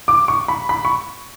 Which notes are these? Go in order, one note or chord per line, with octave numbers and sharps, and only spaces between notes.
D6
C#6
B5
B5
C#6